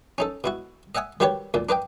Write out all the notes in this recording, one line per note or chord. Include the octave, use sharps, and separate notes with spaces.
C#4 D#4 A4
B2 E4 F#4
D#5 E5 F#5 G#5 D#6
D#3 G3 F#4 G4 B4 C#5
D2 A#2
D4 B4 D#5 G5